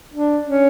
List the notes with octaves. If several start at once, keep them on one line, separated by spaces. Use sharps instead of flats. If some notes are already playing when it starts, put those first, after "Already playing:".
D4
C#4